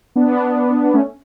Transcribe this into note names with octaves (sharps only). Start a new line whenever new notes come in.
B3 D4
A3 C#4